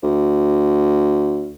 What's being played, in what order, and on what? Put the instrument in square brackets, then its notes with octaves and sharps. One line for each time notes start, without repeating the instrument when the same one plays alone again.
[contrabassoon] D2